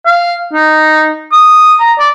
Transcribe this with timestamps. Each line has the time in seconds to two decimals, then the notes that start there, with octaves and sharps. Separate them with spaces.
0.06 F5
0.53 D#4
1.32 D#6
1.80 A#5
1.99 D5